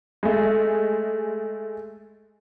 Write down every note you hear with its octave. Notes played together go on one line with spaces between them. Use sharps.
G#3 A3